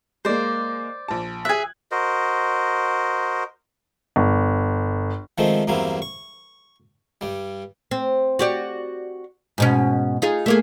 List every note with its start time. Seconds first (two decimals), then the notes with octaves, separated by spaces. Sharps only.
0.25 G#3 A#3 C5 D5
1.08 A#1 A5
1.45 G#4 E5 F#6 G#6
1.91 F#4 A#4 C5 D#5
4.16 G1
5.38 D#3 F3 G#3 A3 C4
5.67 E2 G2 F#3 A#3 C4 E4
6.02 C#6
7.21 G2 G3
7.91 C4
8.39 F#4 G4 D5
9.58 G#2 B2 C#4
10.22 D#4 F4 G#4
10.46 A3 A#3 G#4